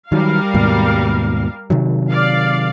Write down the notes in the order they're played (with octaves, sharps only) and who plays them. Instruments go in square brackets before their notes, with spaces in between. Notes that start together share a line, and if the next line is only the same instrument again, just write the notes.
[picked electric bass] D#3 F#3 [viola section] G3 A#4 F5
[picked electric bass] D#2 G#2 B2
C3 D#3 F#3
[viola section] D5 F5